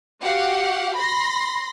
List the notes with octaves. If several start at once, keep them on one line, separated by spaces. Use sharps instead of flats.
F#4 G4 F5 F#5
B5 C6 A#6